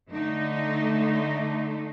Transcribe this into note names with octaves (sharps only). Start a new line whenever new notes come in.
D3 A3 D#4